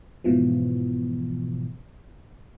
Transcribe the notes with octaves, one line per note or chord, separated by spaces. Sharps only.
G#2 B2 E3 F3